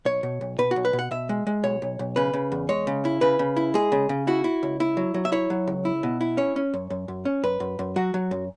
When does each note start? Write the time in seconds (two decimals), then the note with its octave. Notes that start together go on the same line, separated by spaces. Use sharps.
0.05 B1 C#5
0.23 B2
0.41 B1
0.58 B2 B4
0.71 F#4
0.76 B1
0.85 B4
0.93 B2
0.99 F#5
1.11 B2 E5
1.29 G#3
1.47 G#3
1.64 B1 C#5
1.82 B1
1.99 B1
2.16 C#3 B4
2.33 C#3
2.52 E2
2.69 G#3 C#5
2.87 C#3
3.05 E4
3.21 C#3 B4
3.39 C#3
3.56 E4
3.74 G#3 G#4
3.92 C#3
4.09 C#3
4.27 E4 F#4
4.44 E4
4.63 C#2
4.80 E4
4.97 F#3
5.14 F#3
5.25 E5
5.32 E4 C#5
5.50 F#3
5.67 C#2
5.85 E4
6.03 B2
6.21 E4
6.37 C#4 C#5
6.56 C#4
6.74 F#2
6.90 F#2
7.08 F#2
7.25 C#4
7.44 F#2 B4
7.60 F#2
7.79 F#2
7.96 F#3 F#4
8.14 F#3
8.31 F#2